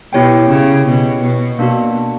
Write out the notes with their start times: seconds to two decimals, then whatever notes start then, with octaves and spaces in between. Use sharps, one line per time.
0.13 B2 E4 G4 C#5 G5
0.49 C#3
0.86 B2
1.22 B2
1.59 B2 A#3 D4 F#4